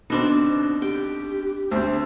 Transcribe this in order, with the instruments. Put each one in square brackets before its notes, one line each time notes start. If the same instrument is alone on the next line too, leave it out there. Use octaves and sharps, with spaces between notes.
[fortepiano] B2 D3 [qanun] C4 D4 D#4
[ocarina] G4 [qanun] G5
[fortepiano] D2 C4 [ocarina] C5